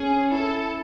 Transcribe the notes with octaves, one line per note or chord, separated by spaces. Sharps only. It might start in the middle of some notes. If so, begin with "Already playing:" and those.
Already playing: C#4 G#4
E4 A4